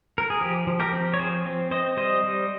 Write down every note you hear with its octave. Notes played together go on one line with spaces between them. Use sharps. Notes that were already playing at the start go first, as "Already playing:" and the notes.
A#4
G#4
F3 G4
F3
G4 A#4
C4
C#5
F3 G#4 C5
C4
C4 C5 D#5
G3 C5 D#5
G3